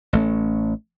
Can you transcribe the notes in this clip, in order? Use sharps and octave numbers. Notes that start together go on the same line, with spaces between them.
A1 A3 C#4